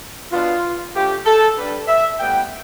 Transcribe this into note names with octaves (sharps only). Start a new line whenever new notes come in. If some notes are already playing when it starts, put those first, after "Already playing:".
B2 B3 D4 F4
D3 F3 A3 G4
A4
D3 G3 D4 B4
E5
A2 G3 B3 E4 G5